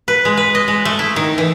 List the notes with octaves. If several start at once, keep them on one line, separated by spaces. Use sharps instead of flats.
B4
G#3
B4
D#5
G#3
A3
E4
D#3
E3